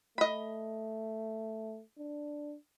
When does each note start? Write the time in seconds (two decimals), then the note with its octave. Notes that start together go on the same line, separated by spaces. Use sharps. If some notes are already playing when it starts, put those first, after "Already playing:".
0.18 A3 D#5 B5
1.98 D4